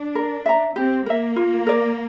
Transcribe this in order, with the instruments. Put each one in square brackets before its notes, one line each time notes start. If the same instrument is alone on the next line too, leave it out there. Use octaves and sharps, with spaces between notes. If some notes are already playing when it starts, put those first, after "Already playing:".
Already playing: [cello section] D4
[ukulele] A#4
E5 A#5
[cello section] C4 [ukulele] G4
[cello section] A#3 [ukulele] A#4 E5
[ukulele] F4
A#4 D5